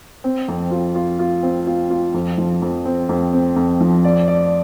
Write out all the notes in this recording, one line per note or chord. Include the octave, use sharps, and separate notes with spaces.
C4
F2
F4
F4
F4
C4
F4
F4
F2
F3
F2
C4
F2
C4
F2
F3
D5
D5